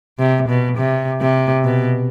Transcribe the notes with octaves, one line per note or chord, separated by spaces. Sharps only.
C3
B2
C3
C3
B2